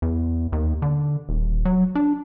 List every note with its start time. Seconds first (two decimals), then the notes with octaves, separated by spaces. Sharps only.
0.02 E2
0.52 D#2
0.82 D3
1.29 D#1
1.65 F#3
1.95 D4